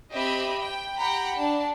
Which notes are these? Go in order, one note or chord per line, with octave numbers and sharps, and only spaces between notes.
C4 G4 D#5 E5 B5
G5
G4 F#5 G5 A#5 B5
D4 A5